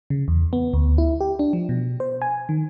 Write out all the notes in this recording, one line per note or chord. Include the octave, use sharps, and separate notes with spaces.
C#3
E2
B3
D2
E4
G4
D4
F3
B2
C5
G#5
D#3